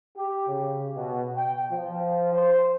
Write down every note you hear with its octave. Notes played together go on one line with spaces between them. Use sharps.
G4
C#3
B2
G5
F3
C5